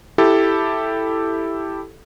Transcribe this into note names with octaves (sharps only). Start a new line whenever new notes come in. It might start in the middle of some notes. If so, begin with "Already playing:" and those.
E4 G4 A4